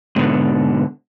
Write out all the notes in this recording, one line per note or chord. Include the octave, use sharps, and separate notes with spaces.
G#2 B2 D3